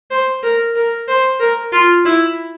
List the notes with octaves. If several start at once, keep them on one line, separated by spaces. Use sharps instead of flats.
C5
A#4
A#4
C5
A#4
F4
E4